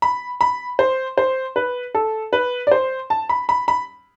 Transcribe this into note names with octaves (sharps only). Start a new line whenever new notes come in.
B5
B5
C5
C5
B4
A4
B4
D5
C5
A5
B5
B5
B5